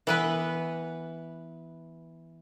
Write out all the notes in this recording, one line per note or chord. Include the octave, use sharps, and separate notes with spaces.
E3 B3 B4